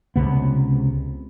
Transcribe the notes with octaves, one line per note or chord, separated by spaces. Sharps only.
C#2 C3 B3